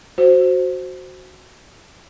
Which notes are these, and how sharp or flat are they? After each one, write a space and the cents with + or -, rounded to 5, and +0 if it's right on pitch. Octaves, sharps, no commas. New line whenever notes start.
F#4 +0 C5 +0